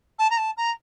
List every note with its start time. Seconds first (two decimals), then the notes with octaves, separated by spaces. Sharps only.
0.18 A5
0.30 A#5
0.37 A5
0.57 A#5